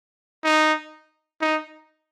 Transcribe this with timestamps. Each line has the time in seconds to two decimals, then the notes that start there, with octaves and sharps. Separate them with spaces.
0.44 D#4
1.42 D#4